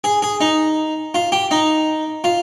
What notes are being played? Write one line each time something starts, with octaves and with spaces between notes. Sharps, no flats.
G#4
G#4
D#4
F4
G4
D#4
F4